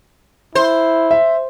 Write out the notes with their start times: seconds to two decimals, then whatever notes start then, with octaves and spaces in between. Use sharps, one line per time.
0.55 E4 C5
1.11 E5